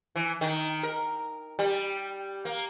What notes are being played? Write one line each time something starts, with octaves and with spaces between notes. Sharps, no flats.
E3
D#3
A#4
G3
A#3